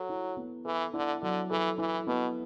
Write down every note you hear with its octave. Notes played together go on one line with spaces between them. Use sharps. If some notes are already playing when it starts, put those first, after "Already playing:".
Already playing: F#3 A4
E4
B3
E3 A4
D3 E4
D3 F#3
E3 A4
E3 E4
B2 B3